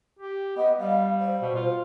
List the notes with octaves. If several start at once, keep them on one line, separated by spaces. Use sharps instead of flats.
G4
B3 D#5
G3 F5
C5
B2
F4